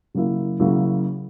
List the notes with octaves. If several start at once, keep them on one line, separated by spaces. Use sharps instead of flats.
C#3 F#3 A#3 E4
C#3 F#3 A#3 E4